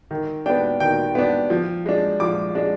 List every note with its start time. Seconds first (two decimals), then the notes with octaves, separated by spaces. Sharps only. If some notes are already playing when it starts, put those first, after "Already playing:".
0.11 D#3
0.46 B3 D4 G5
0.80 D#3 G5
1.15 B3 D4
1.50 F3
1.86 G#3 D4
2.20 F3 D6
2.55 G#3 D4